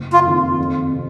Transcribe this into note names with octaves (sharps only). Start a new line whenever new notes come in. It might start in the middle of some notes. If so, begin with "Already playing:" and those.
Already playing: F#1
F4
F2 D#3
F2
C3